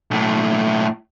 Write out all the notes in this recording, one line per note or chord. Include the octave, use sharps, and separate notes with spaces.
B1 A2